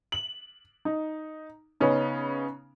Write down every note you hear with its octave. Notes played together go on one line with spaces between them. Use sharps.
F#7
D#4
C#3 B3 C#4 D#4